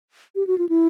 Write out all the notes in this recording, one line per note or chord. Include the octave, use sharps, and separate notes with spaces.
G4
F#4
F4
E4